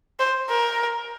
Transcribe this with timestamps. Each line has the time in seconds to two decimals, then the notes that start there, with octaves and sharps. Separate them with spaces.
0.19 C5
0.49 A#4